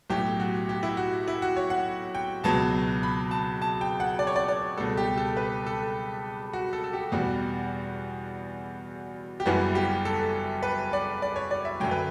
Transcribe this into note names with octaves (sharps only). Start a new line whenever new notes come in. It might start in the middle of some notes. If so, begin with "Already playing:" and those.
B1 A2 F#3 G4
F#4
G4
E4
F#4
E4
F#4
C#5
F#5
G5
C#2 B2 F#3 B3 A5
B5
A5
A5
G5
F#5
D5
C#5
D5
D5
C#2 B2 G3 A4
G4
A4
B4
A4
F#4
A4
A4
G4
E2 B2 G3 F#4
G4
F#1 F#2 E3 G3 B3 F#4
G4
A4
B4
D5
D5
C#5
D5
E5
F#2 D3 F#3 G5
B4